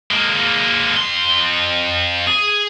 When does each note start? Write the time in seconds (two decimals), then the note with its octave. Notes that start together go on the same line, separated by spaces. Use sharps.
0.11 G#3 A#3
0.97 F2 C6
2.28 G#4